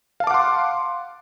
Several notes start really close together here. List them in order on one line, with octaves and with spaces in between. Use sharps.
F5 A5 D6 F#5 C6